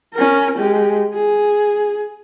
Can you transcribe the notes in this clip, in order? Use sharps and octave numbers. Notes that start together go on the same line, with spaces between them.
C#4 A#4
G#3 G4
G#4